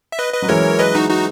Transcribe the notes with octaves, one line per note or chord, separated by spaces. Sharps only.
E5
B4 D#5
B4 D#5
F#3
E3 G#3 A#4 C#5
B4 D#5
D#4 F#4
D#4 F#4